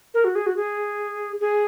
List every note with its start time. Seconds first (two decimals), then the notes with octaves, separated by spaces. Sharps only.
0.14 A#4
0.24 F#4
0.35 G#4
0.46 F#4
0.56 G#4
1.40 G#4